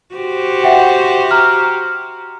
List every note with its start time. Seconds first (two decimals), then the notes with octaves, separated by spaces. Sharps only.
0.15 F#4 G4 C5
0.63 E5 F#5 G5
1.31 A#5 F6